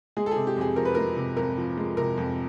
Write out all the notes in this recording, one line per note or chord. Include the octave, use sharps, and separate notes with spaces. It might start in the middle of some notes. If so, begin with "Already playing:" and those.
G#3 G#4
A4
G#4
C3
G4
F2 G#4
F3 A#4
B4
G#3 A#4
C3
F2 A#4
F3
G#3
C3 A#4
F2